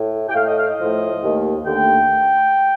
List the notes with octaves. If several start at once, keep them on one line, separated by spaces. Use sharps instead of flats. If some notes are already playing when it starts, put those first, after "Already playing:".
Already playing: A2
G5
A2 A3 F5
D#5
F5
D#5
A2 F3 A3
D#2 D#3 A3
D#2 D3 A3 G5